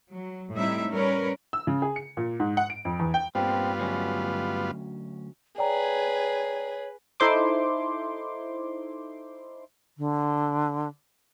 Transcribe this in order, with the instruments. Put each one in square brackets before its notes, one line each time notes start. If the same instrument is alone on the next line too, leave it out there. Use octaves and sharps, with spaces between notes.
[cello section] F#3
A2 G3 C4 D#4 E4 E5
G3 C#4 A#4 B4 C#5
[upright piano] E6
C#3
G#4
C#7
A#2
G#2
F#5
D7
F2
E2
G5
[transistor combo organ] G2 B3 F4 [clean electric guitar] A#2 C4
[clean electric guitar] D2 F#3 C#4
[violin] G#4 B4 [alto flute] C#5 [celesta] D5 G5 A#5
[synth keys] D#4 E4 A4 C5 C6 D6
[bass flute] D3